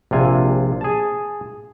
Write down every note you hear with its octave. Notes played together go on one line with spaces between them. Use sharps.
A#1 C3 F4 G#5
G#4 A5